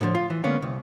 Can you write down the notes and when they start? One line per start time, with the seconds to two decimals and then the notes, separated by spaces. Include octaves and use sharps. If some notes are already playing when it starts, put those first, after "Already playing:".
0.01 A2 D3 E3 F3
0.15 F4
0.30 E3
0.44 D3 G#3 A#3 B3 C#4 F5
0.62 C2